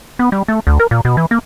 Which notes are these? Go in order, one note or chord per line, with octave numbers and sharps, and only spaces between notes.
B3
G3
A3
D2
A#4
A#2
B2
E3
A#3